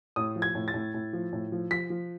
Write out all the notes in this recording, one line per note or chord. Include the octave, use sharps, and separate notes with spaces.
A2 D#6
F3
G#6
A2
A6
A2
A2
F3
A2
F3
F3 B6
F3